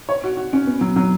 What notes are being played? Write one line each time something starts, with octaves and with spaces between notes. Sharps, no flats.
C#5
F#4
F#4
C#4
B3
F#3
F#3